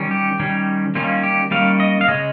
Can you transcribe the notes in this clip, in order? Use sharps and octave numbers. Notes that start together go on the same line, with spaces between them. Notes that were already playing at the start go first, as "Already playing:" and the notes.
Already playing: D#3 G3 C#4
G4
D#3 G3 C#4
D#3 G3 A#3 C#4 F4
G4
D#3 G3 A#3 C#4 F5
D#5
F5
C#3 G#3 C#4 D#5